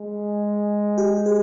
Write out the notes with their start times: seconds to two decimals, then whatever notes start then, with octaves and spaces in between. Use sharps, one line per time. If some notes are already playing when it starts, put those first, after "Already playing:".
Already playing: G#3
0.98 G4
1.26 G#4